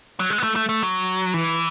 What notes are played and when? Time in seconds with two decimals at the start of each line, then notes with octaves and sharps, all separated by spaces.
0.20 F#3
0.30 G#3
0.38 B3
0.43 A3
0.56 A3
0.69 A3
0.83 F#3
1.34 E3